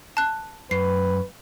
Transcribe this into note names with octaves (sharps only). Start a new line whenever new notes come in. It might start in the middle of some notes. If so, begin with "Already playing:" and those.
A5 F#6
F#2 B4 C7